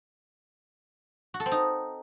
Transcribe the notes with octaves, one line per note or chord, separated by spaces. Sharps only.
F#4
A4
C4
D#4